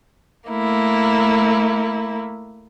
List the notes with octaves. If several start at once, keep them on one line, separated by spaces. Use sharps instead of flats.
A3 A#3 E4